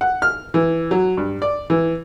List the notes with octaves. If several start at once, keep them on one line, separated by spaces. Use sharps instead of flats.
F#5
F6
E3
F#3
G2
D5
E3